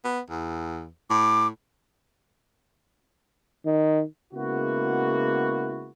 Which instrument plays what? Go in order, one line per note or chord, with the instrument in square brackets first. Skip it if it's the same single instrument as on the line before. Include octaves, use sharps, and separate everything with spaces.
[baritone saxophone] B3
E2
[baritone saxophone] A2 [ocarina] D6
[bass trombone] D#3
[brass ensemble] C#3 G#3 A#3 B3 E4 F#4